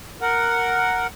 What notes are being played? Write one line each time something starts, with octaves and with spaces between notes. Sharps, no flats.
A#4 F#5